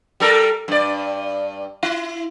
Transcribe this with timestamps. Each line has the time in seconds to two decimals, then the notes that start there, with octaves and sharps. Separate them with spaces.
0.20 G3 A4 A#4
0.68 G2 D5
1.83 E4